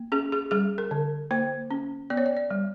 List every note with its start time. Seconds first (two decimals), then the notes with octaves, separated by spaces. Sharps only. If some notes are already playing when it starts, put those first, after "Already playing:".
Already playing: A#3
0.12 C#4 G#4
0.32 G#4
0.51 G3 G#4
0.78 A#4
0.91 D3
1.31 A#3 C5
1.71 C#4
2.10 B3 D5
2.17 C#5
2.26 D5
2.37 D5
2.51 G3